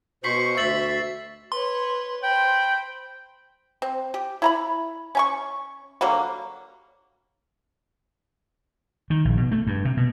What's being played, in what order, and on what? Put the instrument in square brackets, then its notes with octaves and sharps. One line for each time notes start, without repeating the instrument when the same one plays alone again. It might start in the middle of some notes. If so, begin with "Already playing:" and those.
[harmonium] B2 C5 [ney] F#4 [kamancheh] C#6 [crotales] B6 C7 F#7
[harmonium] D2 [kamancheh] E5 [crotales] E6 A6 F#7
[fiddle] B4 C#5 [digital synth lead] C6
[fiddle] C5 B5 [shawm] G5
[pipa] C4
G4
E4 A#5 B5
C#4 G#5 C#6
D3 F#3 G3 A#3
[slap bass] D#3
A#1
B2
A3
G2
C3
B2